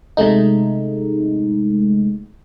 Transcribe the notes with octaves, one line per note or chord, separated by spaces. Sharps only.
C3 G#3 A3 D#4